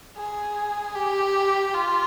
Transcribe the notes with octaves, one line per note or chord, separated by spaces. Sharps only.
G#4
G4
F4